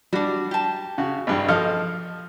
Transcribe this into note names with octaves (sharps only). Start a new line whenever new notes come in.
G3 D4 F#4
G4 A5
C#3 F#4
G#1 G2 G3
F3 A4 D#5 F6